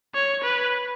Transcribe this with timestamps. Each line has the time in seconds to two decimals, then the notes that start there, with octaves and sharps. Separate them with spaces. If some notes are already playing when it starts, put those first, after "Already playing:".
0.14 C#5
0.43 B4